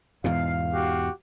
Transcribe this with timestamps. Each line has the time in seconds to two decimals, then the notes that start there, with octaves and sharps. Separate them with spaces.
0.24 E2 G#2 B2 F5
0.74 F#4 G4